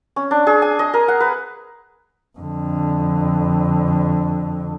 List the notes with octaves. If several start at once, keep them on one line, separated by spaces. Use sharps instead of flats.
C#4
D4
G#4
G#5
D#5
A#4
F#5
B4
F2 D3